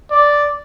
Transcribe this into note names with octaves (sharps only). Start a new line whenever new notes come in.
D5